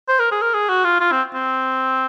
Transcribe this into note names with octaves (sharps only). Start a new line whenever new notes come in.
C5
A#4
G#4
A#4
G#4
F#4
F4
F4
C4
C4